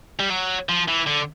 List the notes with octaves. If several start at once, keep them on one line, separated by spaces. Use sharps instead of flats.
G3
F#3
F3
E3
D3